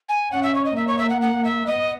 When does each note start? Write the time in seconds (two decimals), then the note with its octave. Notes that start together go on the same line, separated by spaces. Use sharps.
0.09 G#5
0.32 C#4 F#5
0.43 E5
0.55 C#5
0.65 D#5
0.76 A#3 E5
0.87 C#5
0.98 E5
1.10 F#5
1.21 F#5
1.44 E5
1.66 B3 D#5